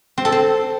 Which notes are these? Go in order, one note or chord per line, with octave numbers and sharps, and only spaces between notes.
C4
A4
C4